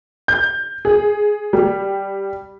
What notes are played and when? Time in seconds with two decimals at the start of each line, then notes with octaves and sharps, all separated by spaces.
0.28 G6
0.85 G#4
1.53 G3